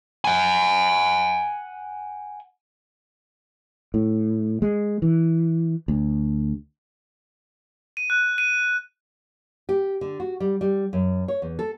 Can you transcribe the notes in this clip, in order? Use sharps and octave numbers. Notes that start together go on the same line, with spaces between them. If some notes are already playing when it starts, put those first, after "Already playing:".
F#5 G#5
A2
G#3
E3
D2
D#7
F#6
D#7
G4
D3
F#4
G3
G3
F#2
C#5
E2
A4